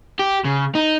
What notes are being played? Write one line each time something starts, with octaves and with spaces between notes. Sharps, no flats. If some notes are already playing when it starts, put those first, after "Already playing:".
G4
C#3
D#4